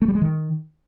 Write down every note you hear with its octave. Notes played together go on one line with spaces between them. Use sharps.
A3
G3
G#3
D#3